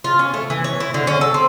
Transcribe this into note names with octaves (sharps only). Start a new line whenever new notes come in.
F4
C#4
A3
E3
C#5
E4
D3
C#4
A4
C4